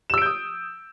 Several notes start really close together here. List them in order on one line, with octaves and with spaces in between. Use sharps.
E7 E6 D7 G6 D#6